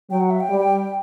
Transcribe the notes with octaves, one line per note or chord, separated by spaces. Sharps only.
F#3 G5
F#5
E5
G5
G3